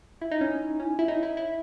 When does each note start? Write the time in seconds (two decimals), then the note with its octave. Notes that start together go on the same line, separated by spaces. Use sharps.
0.21 E4
0.31 D#4
0.41 C#4
0.80 C#4
0.99 E4
1.08 D#4
1.23 E4
1.37 E4